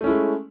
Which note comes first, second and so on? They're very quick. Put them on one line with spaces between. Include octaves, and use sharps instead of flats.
A3 C#4 E4 G#3